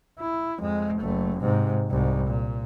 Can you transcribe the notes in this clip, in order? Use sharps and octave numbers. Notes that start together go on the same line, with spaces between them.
E4
F2 G#3
F#1 A3
G#2 C3
C2 G#2
A#2